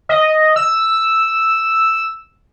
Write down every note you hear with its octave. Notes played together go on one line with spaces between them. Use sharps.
D#5
E6